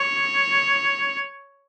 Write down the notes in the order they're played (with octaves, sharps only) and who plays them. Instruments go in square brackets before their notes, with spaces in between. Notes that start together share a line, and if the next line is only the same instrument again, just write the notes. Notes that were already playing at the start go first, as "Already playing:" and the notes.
Already playing: [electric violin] C#5